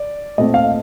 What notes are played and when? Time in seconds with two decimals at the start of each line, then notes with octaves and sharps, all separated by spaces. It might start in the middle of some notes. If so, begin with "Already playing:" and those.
Already playing: D5
0.38 A#2 A3 C4 D#5
0.54 F5